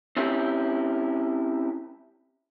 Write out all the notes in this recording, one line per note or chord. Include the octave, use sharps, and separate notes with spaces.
C4 C#4 E4 G4